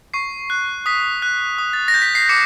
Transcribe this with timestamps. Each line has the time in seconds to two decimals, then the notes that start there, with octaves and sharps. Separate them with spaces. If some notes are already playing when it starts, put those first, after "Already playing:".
0.14 C#6 C7
0.50 F#6
0.86 D#6 B6
1.22 F#6
1.58 D#6
1.73 A6
1.88 A#6
1.94 G6
2.02 B6
2.15 C7
2.29 D6 C#7